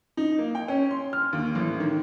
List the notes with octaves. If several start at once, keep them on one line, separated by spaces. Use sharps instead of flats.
D#4
A#3
G5
C#4
C6
F6
D#2
A1
D#3